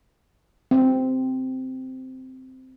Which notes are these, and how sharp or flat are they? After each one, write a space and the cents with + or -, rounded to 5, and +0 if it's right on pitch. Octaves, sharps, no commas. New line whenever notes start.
C4 -10